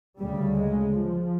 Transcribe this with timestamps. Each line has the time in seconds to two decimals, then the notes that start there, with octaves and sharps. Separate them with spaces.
0.18 D2 C#3 G3
0.58 G#3
0.98 F3